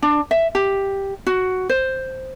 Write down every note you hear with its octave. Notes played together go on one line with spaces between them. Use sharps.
D4
E5
G4
F#4
C5